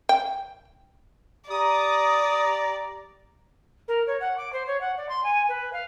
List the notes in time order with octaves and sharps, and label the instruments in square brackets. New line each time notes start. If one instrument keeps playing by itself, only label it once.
[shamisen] G5
[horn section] G4 A#5 [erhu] D5 [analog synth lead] D#6
[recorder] A#4
C#5
F#5
D6
C5
C#5
F#5
D5
C6
G#5
B4
F5